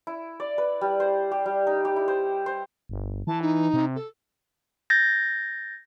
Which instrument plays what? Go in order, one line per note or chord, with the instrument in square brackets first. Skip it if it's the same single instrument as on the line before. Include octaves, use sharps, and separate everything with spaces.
[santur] E4
D5
B4
G3
C5
G4
G3
D#4
G4
E4
C5
C5
[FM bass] G1
[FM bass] E3 [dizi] A5
[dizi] D#4
[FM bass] C3
[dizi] A4
[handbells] G6 A6 A#6